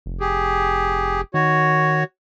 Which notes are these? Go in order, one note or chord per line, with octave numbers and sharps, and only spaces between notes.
F1
G4 G#4
D#3 F#4 C#5